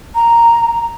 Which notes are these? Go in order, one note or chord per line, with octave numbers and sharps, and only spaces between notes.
A#5